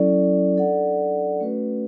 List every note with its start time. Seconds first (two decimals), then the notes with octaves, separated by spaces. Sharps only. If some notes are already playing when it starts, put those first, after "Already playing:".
Already playing: F#3 C#4 E4 A4 D5
0.57 D4 A4 D5 F#5
1.40 A3 C#4 F#4 B4